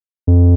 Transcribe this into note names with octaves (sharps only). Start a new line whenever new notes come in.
F2